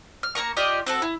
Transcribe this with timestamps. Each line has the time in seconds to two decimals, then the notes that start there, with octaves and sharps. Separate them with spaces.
0.23 F6
0.35 A#3 F4 A#4 C#6
0.57 F4 G4 D5 D#5
0.86 C4 F#4 A4
1.02 E4